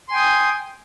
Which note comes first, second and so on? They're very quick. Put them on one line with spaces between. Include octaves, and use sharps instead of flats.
C6 G#5 G5 D#6